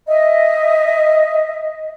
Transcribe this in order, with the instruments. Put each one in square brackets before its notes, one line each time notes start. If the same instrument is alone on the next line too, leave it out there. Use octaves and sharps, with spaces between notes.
[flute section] D#5 E5